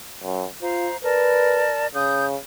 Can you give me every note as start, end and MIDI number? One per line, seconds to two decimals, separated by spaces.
0.23 0.46 42
0.62 0.89 65
0.62 0.97 72
0.62 0.97 77
0.62 0.97 82
1.04 1.87 70
1.04 1.65 71
1.04 1.87 74
1.04 1.87 81
1.95 2.37 49
1.95 2.25 87
1.95 2.25 91